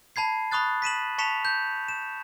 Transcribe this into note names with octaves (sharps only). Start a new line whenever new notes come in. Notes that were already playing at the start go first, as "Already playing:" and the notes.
A5 B5 G#6 C7
B5 C#6 D#6 F#6 A6
B6 D#7 E7 F#7
A5 C#6 B6 C#7 E7 F7
G6
E7